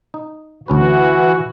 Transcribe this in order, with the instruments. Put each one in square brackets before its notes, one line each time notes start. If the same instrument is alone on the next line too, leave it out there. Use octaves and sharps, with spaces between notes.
[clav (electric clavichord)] D#4
[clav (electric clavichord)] D2 C#4 B4 [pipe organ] E3 F#4